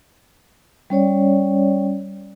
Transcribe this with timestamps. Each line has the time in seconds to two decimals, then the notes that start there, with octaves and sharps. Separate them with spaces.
0.90 G3 C#4 C#5 D5